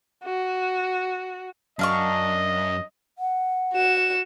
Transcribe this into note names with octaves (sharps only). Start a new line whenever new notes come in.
F#4
F#2 D4 D#5 F5 C#6
F#5
F#4 E7